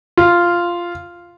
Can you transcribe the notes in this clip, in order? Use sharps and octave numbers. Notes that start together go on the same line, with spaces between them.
F4